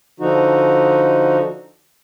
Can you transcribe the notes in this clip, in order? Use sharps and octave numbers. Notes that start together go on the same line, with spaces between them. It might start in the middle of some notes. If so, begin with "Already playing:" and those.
D3 F3 D#4 F#4